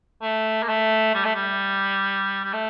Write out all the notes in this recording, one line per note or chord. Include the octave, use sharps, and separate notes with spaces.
A3
A#3
A3
G3
A3
G3
G3
A3